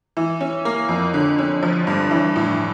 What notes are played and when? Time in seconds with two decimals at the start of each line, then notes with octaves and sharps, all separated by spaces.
0.17 E3
0.41 C#4
0.65 A#3
0.89 F2
1.14 D3
1.39 C#4
1.63 F3
1.87 G2
2.11 E3
2.36 A2